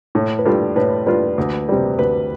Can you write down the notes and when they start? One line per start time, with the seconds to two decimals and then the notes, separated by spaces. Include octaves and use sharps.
0.15 A2
0.39 B4
0.45 G3 D4 F4 A4
0.76 A2 B4
1.06 G3 D4 F4 B4
1.38 D2
1.69 C3 G3
1.99 D2 B4